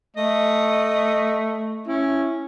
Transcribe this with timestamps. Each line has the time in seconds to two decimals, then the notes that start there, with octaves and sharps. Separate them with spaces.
0.17 A3 D#5
1.87 C#4 E4